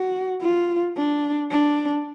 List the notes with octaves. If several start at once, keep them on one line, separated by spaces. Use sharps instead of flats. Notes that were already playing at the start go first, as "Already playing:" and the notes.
Already playing: F#4
F4
D4
D4